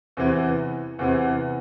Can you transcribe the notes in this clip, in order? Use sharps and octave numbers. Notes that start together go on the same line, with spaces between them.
E2 C3 E3
E2 C3 E3